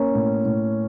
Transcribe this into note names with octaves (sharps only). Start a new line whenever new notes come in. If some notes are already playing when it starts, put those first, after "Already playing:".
Already playing: A#3 C#4
A2
A2